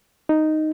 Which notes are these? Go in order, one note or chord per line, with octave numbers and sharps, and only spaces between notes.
D#4